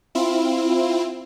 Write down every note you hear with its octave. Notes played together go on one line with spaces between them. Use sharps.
C4 E4 F4